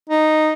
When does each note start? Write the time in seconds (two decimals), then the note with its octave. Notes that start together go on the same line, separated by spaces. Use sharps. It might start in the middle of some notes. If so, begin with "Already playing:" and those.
0.09 D#4